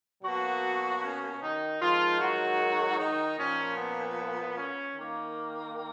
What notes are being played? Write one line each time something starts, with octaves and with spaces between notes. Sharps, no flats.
B2 F#3 A#3 F#4
C#4
D#3 D#4
D#3 F3 G#3 F4
F#3 F#4
D#3 D#4
A#2 F3 A#3 C#4
B3
C#4
D#3 A#3